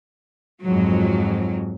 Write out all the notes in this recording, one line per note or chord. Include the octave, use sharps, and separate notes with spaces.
F2 G#2 F#3